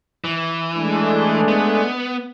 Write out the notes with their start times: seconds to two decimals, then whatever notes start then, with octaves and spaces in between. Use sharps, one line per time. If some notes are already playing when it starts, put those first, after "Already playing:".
0.24 E3
0.75 G#3 A3 D4
1.48 B3